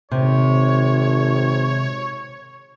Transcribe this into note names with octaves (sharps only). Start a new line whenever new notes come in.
G#1 C3 C#5